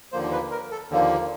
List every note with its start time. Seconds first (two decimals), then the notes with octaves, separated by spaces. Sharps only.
0.12 D#2 D3 F3 A#3 C5
0.32 B4
0.51 A#4
0.71 A4
0.90 D#2 D3 F3 A#3